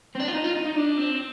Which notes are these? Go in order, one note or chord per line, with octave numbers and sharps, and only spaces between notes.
C4
D4
F4
D#4
F4
D#4
D#4
D4
C4